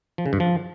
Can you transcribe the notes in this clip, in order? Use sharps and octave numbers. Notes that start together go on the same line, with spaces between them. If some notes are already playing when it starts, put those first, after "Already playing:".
F3
C#3
G2
F3